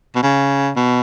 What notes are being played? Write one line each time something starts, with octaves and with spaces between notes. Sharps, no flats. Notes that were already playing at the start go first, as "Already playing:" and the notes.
B2
C#3
B2